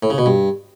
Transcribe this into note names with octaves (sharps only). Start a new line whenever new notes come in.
A2
C#3
B2
G2